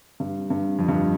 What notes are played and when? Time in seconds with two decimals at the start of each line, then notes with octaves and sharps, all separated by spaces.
0.20 G2
0.50 G2
0.79 F2
0.89 G2